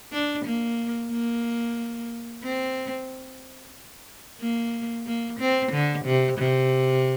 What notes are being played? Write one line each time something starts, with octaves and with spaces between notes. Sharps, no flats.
D4
A#3
A#3
C4
A#3
A#3
C4
D3
C3
C3